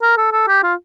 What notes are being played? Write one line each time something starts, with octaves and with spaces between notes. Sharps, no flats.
A#4
A4
A4
G4
F4